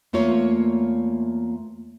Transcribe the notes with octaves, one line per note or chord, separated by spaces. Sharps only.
E2 A3 A#3 F4 C#5